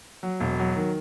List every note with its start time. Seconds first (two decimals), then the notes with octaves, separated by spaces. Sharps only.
0.23 F#3
0.40 E1
0.59 F#3
0.76 D#3